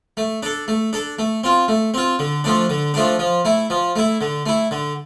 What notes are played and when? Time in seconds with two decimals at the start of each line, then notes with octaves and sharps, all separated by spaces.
0.17 A3
0.43 D4 A4
0.68 A3
0.93 D4 A4
1.19 A3
1.44 C4 F4
1.68 A3
1.94 C4 F4
2.19 D3
2.44 F3 A3 D4
2.70 D3
2.94 F3 A3 D4
3.19 F3
3.45 A3 E4
3.70 F3
3.96 A3 E4
4.21 D3
4.46 A3 E4
4.71 D3